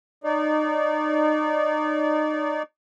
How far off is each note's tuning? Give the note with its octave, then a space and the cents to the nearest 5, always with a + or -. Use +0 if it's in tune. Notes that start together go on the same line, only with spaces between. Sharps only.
D#4 -30 D5 -30